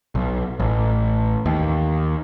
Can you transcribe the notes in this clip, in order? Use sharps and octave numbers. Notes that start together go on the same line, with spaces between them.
B1
A1
D#2